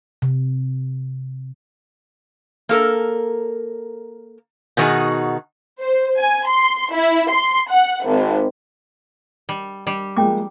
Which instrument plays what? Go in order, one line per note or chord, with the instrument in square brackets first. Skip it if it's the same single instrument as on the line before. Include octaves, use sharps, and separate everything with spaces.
[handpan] C3
[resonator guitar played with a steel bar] A#3 A4 A#4
B2 D#3 F#3 D#4 F#4 G#4
[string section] C5
G#5
C6
E4
C6
F#5
G#1
[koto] G3
G3 G4
[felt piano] F3 G#3 A#3 [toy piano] C#4 G5 D6